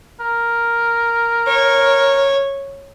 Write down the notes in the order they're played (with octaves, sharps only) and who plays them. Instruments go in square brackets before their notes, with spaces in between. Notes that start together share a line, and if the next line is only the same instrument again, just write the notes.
[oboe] A#4
[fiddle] C#5